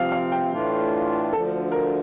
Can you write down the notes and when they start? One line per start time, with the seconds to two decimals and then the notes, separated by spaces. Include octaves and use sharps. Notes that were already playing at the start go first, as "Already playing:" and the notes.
Already playing: C3 F3 C4 F5
0.12 F5
0.32 G5
0.52 A2 E3 A3 D4 F4
1.33 D2 D3 F3 A4
1.72 A#4